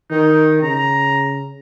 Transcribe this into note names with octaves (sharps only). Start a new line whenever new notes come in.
D#3 D#4
C#3 A#5